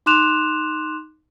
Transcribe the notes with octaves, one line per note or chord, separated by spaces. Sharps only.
D#4 C6 D6 F#6 E7 F7